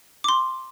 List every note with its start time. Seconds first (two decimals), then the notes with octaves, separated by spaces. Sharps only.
0.24 D6
0.28 C6